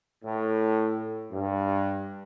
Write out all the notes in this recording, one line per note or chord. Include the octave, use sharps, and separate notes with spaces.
A2
G2